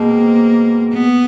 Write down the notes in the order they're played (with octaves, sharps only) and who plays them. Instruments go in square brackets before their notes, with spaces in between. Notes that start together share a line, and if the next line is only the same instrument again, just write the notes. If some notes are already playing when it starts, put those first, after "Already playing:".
Already playing: [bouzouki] B2 G#3 C4 [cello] A#3
[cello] B3